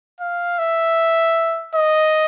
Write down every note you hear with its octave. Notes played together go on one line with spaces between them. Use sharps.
F5
E5
D#5